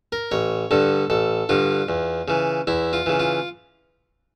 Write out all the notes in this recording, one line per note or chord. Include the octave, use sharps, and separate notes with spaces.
A#4
A1 C#5
G2 D3 A4
A1 A4
G2 D3 F4
E2
C#3 E3
E2 E4
F4
C#3 E3
F4